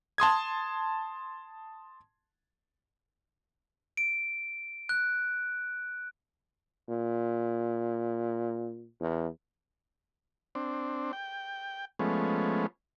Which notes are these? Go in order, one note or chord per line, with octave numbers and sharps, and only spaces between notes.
A5 C6 D#6 G#6
D7
F#6
A#2
E2
C4 D4
G5
F3 G#3 A3 B3 C#4